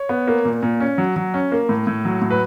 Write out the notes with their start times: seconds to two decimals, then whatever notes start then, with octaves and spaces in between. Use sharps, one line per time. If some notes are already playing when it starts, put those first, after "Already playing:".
Already playing: C#5
0.09 B3
0.27 A#3
0.45 A#2
0.63 A#2
0.80 C#4
0.98 F#3
1.16 F#3
1.34 C#4
1.52 A#3
1.69 A2
1.87 A2
2.05 F#3
2.21 A2
2.31 B4